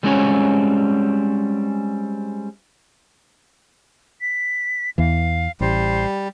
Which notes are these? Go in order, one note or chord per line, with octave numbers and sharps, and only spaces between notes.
G3 G#3 C4 C#4 F#4 C#5
B6
E2 E3 F5
A1 G3 C5